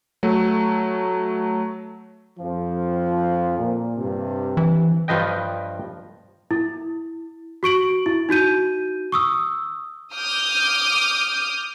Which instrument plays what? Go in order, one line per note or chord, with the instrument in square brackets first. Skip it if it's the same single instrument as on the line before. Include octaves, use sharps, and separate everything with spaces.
[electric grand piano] F#3 A3
[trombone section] F2 F3
A#2
G2 C3
[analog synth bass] E3
[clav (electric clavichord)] G2 F3 B4 D#5 G5
[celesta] E4
F#4 C#6 D7 F#7
E4
D#4 F#4 G6 D#7
C#6 D#6 E6
[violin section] D6 D#6 F6 G6